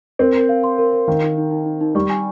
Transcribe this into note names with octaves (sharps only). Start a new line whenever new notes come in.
C4 A#4
A#4
F5
C6
A#4
A#4
D#3 F5
D#4
D#4
D#4
D#4
D#4
G3 C#6
G#5